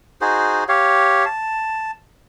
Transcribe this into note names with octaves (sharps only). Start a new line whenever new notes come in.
D#4 F#4 G#4 C5
G4 C#5 F5
A5